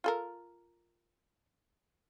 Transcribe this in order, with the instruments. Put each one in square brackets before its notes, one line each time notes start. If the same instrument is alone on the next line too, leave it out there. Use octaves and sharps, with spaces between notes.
[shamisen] F4 A4 A#4